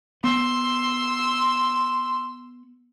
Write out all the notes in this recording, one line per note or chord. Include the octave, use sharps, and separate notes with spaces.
B3 C6 E6